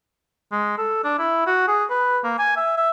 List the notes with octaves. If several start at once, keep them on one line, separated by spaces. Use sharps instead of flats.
G#3
A4
D4
E4
F#4
G#4
B4
A#3
G#5
E5
E5